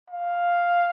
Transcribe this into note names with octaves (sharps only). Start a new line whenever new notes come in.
F5